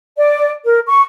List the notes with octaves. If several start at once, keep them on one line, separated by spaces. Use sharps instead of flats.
D5
A#4
C#6